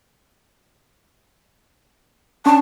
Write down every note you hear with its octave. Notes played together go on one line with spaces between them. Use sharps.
C#4 D4 A5 C#6